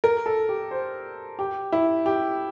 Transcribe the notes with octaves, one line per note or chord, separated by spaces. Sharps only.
A#4
A4
G4
C5
G4
E4
G4